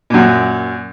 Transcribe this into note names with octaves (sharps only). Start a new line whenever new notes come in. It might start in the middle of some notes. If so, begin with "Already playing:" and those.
F#2 A#2